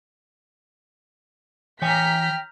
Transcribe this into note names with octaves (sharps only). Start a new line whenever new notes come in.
E3 C#5 G5 G#5 A#5 F6 G6 B6